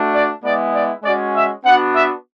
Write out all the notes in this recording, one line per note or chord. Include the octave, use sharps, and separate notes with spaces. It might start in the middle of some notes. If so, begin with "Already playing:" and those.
Already playing: A3 D4 F#4
D5
G#3 B3 E4 D5
D5
G#3 C#4 F#4 D5
E5
B3 D4 F#4 F#5
E5